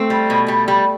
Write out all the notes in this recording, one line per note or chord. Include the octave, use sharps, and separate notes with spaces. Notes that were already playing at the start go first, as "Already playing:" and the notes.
Already playing: A3 C4
G3
B2
G3
G3